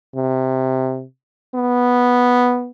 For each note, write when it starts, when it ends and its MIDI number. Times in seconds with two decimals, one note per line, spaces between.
0.16 1.04 48
1.55 2.71 59